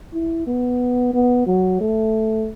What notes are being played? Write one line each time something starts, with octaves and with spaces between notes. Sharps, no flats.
E4
B3
B3
F#3
A3